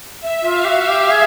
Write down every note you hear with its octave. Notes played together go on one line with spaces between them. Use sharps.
E5
F4
F5
G4
F#4
E5
G4
G#4